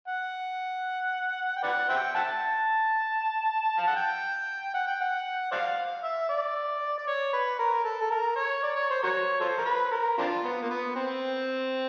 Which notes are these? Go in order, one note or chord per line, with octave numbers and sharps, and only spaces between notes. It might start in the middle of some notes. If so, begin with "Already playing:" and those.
F#5
G5
B4 D5 F#5
C5 E5 G5
E5 F#5 A5
F5
F#5
G5
F#5
G5
F#5
C5 D5 F5
E5
D5
D5
C#5
B4
A#4
A#4
A4
A4
A#4
C#5
D5
C#5
C5
F#4 A#4 C#5
F4 A4 C5
A#4
B4
A#4
C4 D4 F4
B3
A#3
B3
C4